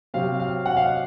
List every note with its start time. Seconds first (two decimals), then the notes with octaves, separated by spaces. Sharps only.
0.14 C3 F#3 C4 F5
0.40 F5
0.66 F#5
0.77 F5
0.83 D#5